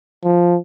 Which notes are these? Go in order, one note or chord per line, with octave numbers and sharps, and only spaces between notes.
F3